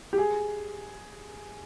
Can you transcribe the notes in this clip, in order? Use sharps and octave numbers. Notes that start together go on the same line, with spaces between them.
G4
G#4